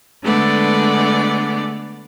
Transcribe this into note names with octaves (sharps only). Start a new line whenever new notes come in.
D3 G#3 A3 B3 D5